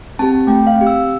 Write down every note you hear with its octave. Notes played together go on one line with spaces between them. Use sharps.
C4 G4 A5
A3 G5
F5
C4
G4
E6